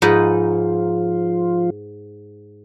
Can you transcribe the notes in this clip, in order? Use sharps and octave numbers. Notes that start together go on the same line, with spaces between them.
G#2 F3 D#4 F4 B4